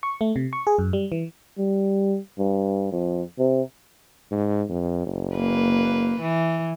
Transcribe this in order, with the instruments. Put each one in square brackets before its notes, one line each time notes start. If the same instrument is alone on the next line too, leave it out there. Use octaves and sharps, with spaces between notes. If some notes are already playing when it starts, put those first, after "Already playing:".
[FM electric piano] C#6
A3
C3
C#6
G#4
F#2
G3
E3
[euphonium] G3
G2
F2
C3
[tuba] G#2
F2
F#1
[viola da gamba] A#3 B4
E3